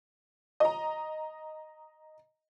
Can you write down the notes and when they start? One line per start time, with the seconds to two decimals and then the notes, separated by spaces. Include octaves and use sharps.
0.60 D#5 A#5